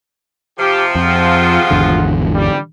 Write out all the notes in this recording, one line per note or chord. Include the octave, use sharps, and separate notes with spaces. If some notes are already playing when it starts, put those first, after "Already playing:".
C3 F3 G4
F2 F4 G#4 F#5
G#1 E2 D3
G3